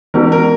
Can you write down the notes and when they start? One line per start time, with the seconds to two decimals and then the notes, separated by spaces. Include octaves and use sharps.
0.14 E3 G#3 B3 D#4 F#4 A#4
0.32 A#4